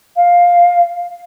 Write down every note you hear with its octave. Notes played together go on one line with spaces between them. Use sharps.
F5